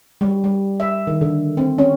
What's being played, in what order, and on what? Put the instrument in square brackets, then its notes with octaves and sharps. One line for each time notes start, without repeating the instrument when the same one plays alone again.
[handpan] G3
G3
E5
D#3
D3
C4
C#4